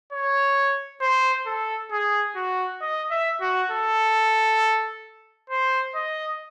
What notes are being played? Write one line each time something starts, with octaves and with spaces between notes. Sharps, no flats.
C#5
C5
A4
G#4
F#4
D#5
E5
F#4
A4
C5
D#5